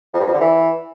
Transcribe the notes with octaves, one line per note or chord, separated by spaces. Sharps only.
F2
G2
F2
D3
E3